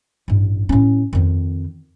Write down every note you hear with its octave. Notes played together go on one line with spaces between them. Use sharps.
A1 G2
A2 C#4
F2 D#3